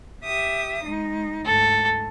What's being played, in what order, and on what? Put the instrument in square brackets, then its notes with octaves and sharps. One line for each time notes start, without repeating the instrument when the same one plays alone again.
[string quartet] G4 E5 D#6
G#3 D#4
[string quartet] D2 G#2 [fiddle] A4